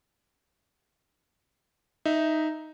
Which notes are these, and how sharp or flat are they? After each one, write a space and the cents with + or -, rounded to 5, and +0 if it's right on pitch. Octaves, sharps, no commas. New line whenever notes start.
D#4 +0 E5 +0